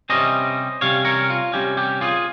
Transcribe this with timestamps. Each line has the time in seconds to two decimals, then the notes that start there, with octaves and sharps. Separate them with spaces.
0.10 C3 G3 C#4 C5 D#5
0.81 C3 G3 C#4 C#5 F5
1.05 A#4 C#5
1.30 F4
1.53 C3 G3 C#4 G4
1.77 G4
2.01 F4 G#4